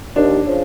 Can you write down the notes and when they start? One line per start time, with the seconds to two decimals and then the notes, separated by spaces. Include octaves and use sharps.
0.16 D#2 D4
0.46 C#3 F3